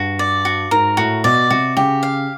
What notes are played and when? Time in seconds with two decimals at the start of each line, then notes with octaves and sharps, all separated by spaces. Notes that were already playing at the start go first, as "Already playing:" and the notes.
Already playing: G2 F#4
0.19 D5
0.45 F#4
0.71 G#2 A#4
0.97 A2 F#4
1.24 B2 D5
1.50 C3 F#4
1.77 C#3 G4
2.03 F5